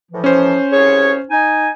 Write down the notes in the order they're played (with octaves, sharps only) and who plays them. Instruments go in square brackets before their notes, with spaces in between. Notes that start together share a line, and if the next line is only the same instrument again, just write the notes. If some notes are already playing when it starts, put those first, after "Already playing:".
[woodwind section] A2 E3 F3
[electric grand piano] C#4 C5
[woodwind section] C2 G#4 C#5
D#4 G#5